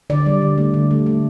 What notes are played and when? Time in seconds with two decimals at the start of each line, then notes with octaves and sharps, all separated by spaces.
0.10 D3 D5
0.26 G3
0.42 D3
0.58 A3
0.74 D3
0.91 A3
1.06 A3